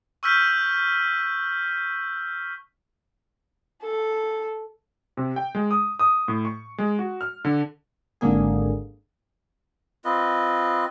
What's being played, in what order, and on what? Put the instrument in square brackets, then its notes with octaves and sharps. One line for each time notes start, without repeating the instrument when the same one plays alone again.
[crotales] C#6 E6 F6 G6 B6
[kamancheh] A4
[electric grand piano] C3
G5
G#3
D#6
D#6
A2
C#6
G#3
F#4
F6
D3
[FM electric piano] G#1 D3 A#3 G#4
[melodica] C4 F4 B4 D#5